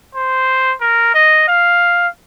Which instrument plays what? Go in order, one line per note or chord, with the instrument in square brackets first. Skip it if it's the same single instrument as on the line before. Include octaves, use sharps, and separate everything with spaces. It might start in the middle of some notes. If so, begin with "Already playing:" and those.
[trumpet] C5
A#4
D#5
F5